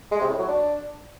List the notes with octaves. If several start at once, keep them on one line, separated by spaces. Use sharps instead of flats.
G#3
C3
A2
F#3
D4